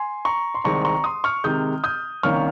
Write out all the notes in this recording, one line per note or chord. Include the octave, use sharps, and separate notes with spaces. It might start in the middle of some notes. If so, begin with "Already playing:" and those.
Already playing: G#5 C6
A#5 C#6
C6
C2 C3 D#3 G#3 C4 A#5 C#6
A#5 C#6
C6 D#6
C#6 F6
C3 D#3 G#3 D#6 G6
D#6 G6
C2 C3 D#3 A#3 C#4 C#6 F6